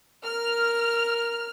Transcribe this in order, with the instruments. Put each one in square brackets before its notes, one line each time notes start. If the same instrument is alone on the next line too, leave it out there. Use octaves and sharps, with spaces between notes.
[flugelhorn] A#4 [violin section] F6